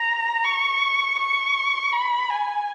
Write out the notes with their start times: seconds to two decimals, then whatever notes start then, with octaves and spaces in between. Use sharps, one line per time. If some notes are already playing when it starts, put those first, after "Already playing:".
Already playing: A#5
0.44 C#6
1.19 C#6
1.92 B5
2.30 G#5